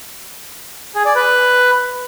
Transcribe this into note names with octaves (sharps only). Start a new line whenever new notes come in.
G#4
D5
B4